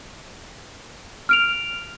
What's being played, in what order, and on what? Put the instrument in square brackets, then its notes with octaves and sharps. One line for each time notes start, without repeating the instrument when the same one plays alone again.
[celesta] F6 D7 F7